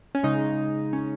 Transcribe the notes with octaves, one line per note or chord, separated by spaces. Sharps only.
C#4
C#3 G#3 D#4
C#4